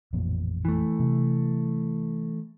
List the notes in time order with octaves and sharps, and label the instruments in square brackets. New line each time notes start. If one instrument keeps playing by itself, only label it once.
[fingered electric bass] A1 F2 A#2
[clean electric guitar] E3 A3
[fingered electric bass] C3